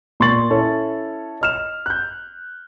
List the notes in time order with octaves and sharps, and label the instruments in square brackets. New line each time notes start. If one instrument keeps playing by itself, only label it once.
[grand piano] A#2 C6 C#6 A6 F#7
C#4 E4 A4 C#5
D#5 F6 E7
F#6 G6